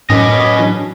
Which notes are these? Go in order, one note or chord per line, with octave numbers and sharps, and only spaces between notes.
F#2 A2 C#4 B4 D#5 D6
F#3 D4